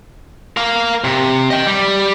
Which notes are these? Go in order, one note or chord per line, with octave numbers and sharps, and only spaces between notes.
A#4 F5
C3
D#5 G5
G3